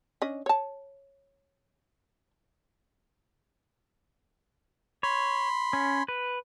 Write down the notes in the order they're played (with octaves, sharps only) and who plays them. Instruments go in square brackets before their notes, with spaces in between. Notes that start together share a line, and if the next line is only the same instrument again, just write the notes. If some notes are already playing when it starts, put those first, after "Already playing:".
[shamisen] C#4 D4 D#5
C#5 A5
[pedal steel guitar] C#5 [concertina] B5 C6
[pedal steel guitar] C#4
B4